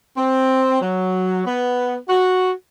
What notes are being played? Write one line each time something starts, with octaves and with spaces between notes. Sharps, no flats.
C4
F#3
B3
F#4